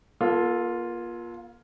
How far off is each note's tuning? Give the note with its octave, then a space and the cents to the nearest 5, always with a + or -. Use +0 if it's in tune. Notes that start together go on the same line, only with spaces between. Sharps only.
A#3 +40 F4 +0 A4 -5